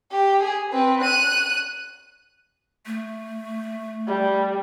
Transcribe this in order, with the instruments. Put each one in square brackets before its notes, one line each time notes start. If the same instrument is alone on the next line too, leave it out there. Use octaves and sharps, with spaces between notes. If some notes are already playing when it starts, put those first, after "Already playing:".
[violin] G4
G#4
C4 B4
F#6 D#7
[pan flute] A3
[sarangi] G3